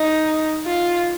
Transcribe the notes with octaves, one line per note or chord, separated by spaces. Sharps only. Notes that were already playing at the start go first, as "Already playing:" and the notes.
Already playing: D#4
F4